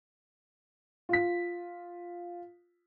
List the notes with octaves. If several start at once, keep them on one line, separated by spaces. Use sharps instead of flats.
F4 B6